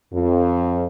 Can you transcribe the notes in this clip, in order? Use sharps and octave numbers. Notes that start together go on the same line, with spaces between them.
F2